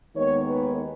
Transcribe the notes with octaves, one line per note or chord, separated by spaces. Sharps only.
D#2 D#3 G#3 B3 C#5
B4